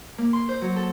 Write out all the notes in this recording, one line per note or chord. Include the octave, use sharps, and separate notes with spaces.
A#3
C6
C5
F#3
A4